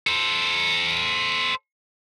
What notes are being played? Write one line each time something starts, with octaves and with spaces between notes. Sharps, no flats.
A4 C5